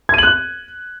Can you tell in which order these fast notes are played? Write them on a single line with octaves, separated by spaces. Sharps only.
G#6 D#7 F#7 F#6